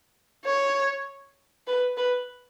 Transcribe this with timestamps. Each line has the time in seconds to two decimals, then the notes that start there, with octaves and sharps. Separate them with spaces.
0.47 C#5
1.68 B4
1.97 B4